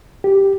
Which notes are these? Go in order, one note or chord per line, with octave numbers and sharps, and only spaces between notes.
G4